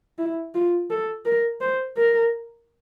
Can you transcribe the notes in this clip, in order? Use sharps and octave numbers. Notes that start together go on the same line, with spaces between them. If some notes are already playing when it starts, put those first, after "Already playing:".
E4
F4
A4
A#4
C5
A#4